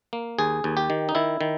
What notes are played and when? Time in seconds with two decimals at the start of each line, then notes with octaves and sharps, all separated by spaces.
0.13 A#3
0.38 D#2 G#4
0.64 D#2
0.77 G4
0.90 D#3
1.09 D#4
1.15 D#3 E4
1.41 D#3